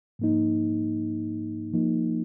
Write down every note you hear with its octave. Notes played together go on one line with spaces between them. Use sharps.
G#2 F3 A#3 D#4
F3 A#3 D#4